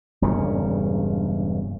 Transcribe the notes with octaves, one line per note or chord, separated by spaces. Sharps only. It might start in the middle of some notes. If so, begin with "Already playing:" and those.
E1 G2 A#2 C#3